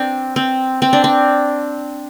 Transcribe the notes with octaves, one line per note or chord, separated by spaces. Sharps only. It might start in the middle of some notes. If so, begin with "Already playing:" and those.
Already playing: C4 D4
C4
C4
D4
C4